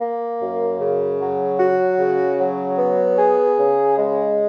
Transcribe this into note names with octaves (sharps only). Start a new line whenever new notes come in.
A#3
F#2
C#3
F#3
F#4
C#3
F#3
B3
G#4
C#3
G#3